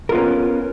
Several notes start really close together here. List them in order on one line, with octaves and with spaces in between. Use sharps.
A#4 F4 B3 C#4